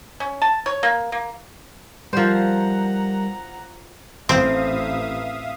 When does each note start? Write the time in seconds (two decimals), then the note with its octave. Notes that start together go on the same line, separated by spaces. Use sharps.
0.20 C#4
0.42 A5
0.66 C#5
0.83 A#3
1.12 A#3
2.13 F3 G3 A#4 C5 F#5 A#5
4.29 A1 C4 E5 F5 D#6